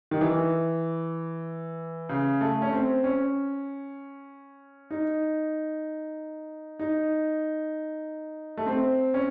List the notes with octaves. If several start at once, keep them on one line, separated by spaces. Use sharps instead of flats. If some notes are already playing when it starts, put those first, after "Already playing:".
D#3
E3
C#3
A3
C#4
C4
C#4
D#4
D#4
A3
C4
C#4